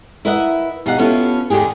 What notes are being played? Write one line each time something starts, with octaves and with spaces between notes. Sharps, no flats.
E4 A#4 B4 D#5 E5 F#5
B2 D#4 G4 F5 F#5
B3 C#4 E4 F4 G4 A4
D#2 G#2 D3 G4 G#4